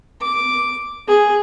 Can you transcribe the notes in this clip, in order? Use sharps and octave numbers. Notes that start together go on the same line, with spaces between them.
D6
G#4